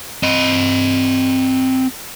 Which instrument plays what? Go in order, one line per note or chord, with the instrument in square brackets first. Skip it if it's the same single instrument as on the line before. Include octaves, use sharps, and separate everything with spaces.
[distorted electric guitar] C4 D#5